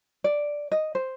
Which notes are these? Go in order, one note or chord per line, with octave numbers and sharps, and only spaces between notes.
D5
D#5
C5